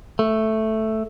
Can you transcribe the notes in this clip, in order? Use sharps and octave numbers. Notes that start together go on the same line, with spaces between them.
A3